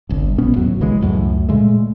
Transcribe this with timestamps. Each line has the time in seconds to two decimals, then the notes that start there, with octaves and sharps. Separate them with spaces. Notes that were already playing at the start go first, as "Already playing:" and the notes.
0.09 G1 C2
0.38 A#1 B2 B3 C#4
0.56 D#2 A2 F#3
0.81 B1 C#3 E3 G#3
1.01 C#2 F#2 A2
1.49 A#2 C#3 G#3 A3